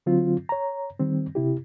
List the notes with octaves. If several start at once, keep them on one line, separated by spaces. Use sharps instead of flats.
D3 F#3 C4 F4
C#5 A#5
D#3 G3 C4
C3 E4 G4